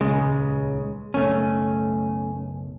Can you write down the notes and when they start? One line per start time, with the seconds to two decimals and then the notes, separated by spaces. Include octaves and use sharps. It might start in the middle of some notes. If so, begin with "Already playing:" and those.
0.01 D#1 C#2 C#3 G#3
1.14 F#1 B1 A3 C#4